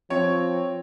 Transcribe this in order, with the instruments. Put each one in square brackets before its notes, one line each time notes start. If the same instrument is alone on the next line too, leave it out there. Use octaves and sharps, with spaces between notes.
[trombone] F3 [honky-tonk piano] C4 C#5